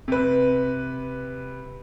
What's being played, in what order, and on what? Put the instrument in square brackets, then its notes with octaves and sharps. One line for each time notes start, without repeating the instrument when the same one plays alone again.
[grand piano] C3 B4